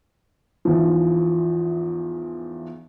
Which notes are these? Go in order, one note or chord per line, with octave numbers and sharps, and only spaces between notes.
E2 G#2 E3 F3